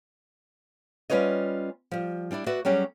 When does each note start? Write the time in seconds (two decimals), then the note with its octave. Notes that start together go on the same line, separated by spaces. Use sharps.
1.10 G3 C#4 F4 B4 C#5 D#5
1.91 F3 G3
2.31 G3 D4 E4 D5
2.46 F#4 B4 D5 E5
2.65 F#3 G3 C#4 G4 G#4